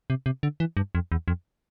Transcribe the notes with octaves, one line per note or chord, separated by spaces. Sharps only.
C3
C3
D3
E3
G2
F2
E2
F2